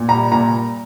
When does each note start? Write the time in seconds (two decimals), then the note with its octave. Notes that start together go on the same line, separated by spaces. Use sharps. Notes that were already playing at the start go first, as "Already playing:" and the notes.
Already playing: A#2
0.08 G3 A#5
0.32 A#2 A#5